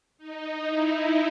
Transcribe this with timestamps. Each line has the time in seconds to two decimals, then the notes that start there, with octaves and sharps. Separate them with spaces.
0.18 D#4
0.67 E4